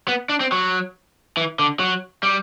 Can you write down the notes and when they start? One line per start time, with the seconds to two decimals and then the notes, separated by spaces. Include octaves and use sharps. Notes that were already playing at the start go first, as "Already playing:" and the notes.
0.08 B3
0.29 D4
0.40 C4
0.52 F#3
1.37 E3
1.59 D3
1.79 F#3
2.23 G3